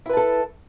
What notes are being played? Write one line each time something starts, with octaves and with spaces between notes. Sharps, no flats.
E4 A4 B4 A5